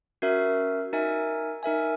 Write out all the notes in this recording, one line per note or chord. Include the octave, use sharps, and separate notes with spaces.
C#4 F#4 A#4 E5
D#4 A#4 E5 G#5
D#4 A#4 E5 G#5